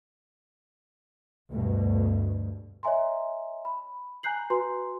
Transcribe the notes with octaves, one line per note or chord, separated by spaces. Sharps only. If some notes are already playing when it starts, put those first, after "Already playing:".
D2 G2 B2
C#5 D#5 E5 G#5 A#5 C6
B5
G#5 A#5 F#6 G6 C7 F#7
F#4 B4 G#5 A#5 C6